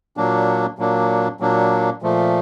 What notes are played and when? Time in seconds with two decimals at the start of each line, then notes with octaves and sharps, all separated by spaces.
0.17 A#2 F#3 A#3 D4
0.79 A#2 F#3 A#3 D4
1.40 A#2 F#3 A#3 D4
2.02 A#2 F3 A3